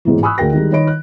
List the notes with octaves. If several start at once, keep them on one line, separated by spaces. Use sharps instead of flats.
A1 G#2 B2 E3
G#5 B5 C#6 D#6 E6 F#6
D2 G#4 A#4 G5 A#6
D#3 G3 G#3
D#3 C#5 D#5 B5 D7
F#6